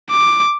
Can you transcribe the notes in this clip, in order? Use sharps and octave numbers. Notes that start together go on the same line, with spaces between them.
D6